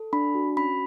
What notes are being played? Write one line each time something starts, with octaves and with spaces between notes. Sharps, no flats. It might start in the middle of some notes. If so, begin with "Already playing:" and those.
Already playing: A4
D4 B5
F#4
C#4 B5